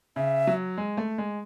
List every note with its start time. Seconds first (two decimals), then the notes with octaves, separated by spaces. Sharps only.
0.16 C#3 E5
0.47 F#3
0.77 G#3
0.97 A3
1.18 G#3